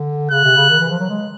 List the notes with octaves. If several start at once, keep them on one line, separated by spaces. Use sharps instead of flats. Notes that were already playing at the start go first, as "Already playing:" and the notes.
Already playing: D3
C#3 F#6
C3
C#3
D#3
E3
F3
F#3
G#3